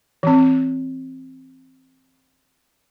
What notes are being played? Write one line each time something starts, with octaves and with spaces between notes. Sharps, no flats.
E3 C4